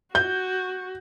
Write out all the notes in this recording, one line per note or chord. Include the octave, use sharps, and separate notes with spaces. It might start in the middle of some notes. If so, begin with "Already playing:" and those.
F#4 G6